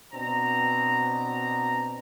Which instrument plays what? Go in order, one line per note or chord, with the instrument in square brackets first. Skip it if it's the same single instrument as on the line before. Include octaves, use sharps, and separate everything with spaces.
[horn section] B2 C4 D4 A#5